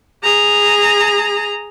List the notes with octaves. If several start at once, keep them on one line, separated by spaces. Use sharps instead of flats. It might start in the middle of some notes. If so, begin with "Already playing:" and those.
G#4 A#5